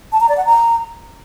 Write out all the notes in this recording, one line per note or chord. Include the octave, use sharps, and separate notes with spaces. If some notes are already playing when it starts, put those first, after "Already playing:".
A5
A#5
D5
F#5
A#5